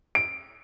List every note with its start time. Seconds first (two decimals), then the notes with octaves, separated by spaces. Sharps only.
0.15 D7